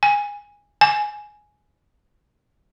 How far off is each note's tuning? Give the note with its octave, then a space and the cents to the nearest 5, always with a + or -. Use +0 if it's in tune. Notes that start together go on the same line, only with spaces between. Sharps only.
G#5 -15
G#5 +10